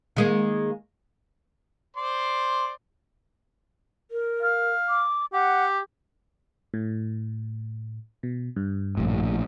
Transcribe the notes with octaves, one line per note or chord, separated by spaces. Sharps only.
D#3 G#3 A#3
C5 D5 C6
A#4
F5
D6
G4 F#5
A2
B2
G2
A#1 A2